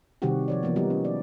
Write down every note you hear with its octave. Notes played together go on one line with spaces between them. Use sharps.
C3 D#3 G3 C4 F#4 G4
F3 C#5 D5
E3 F3 A#3 B3
F#3 G3 B3 D#4 F#4
C#4
D5